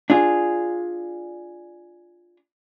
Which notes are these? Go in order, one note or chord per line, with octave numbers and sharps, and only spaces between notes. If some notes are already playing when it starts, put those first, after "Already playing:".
D4 F4 G#4